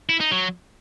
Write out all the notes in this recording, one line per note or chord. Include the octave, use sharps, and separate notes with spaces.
E4
D#4
F#3